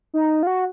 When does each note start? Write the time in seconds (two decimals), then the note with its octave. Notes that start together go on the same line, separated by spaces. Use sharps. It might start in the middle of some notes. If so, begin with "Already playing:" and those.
0.14 D#4
0.43 F4
0.47 F#4